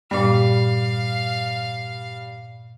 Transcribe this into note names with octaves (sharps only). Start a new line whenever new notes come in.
G2 A#2 G3 F5